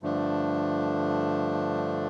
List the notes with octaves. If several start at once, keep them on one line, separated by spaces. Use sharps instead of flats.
G2 D3 F3 A3 D4